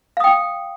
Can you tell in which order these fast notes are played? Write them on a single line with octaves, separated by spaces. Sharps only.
F5 D#6 G5